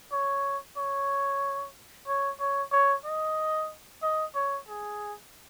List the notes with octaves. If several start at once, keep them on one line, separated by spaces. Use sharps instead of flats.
C#5
C#5
C#5
C#5
C#5
D#5
D#5
C#5
G#4